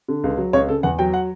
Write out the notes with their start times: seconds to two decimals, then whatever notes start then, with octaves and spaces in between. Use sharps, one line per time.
0.08 D3
0.24 C#2
0.38 F#3
0.53 C#2 C#5
0.68 C#3 A4
0.83 E2 F#5
0.99 F#3 G5
1.14 F#5